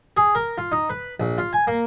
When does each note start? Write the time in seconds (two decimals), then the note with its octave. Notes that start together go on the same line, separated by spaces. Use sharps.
0.17 G#4
0.35 A#4
0.58 F4
0.72 D#4
0.90 B4
1.20 A#1
1.38 F4
1.53 G#5
1.67 A#3